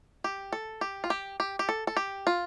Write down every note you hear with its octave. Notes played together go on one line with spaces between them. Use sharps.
G4
A4
G4
F4
G4
G4
G4
A4
A4
G4
F4